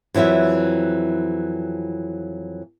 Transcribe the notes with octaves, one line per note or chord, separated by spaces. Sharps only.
F2 E3 F#3 E4 E5